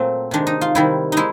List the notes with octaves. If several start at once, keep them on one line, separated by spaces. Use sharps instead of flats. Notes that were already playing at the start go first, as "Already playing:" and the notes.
Already playing: A#2 F#3 A3 C4
C3 D#3 G#3 D4
D#4
F4
C3 D#3 G3 E4
G#3 D#4 E4